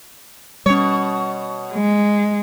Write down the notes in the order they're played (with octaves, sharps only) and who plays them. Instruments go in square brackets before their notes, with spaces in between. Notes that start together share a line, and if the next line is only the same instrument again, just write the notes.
[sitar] B2 C#5 [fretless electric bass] G3 C#4
[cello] G#3